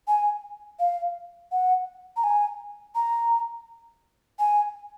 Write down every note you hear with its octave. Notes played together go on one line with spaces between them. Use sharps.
G#5
F5
F#5
A#5
G#5
A#5
G#5